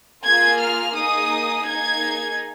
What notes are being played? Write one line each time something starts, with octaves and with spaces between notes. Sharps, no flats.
A#3 F4 G#4 G#6
F6
A#3 D#4 G#4 D#6
A#3 D#4 G#4 G#6